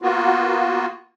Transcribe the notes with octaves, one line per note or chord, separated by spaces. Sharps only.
A#3 B3 F4 F#4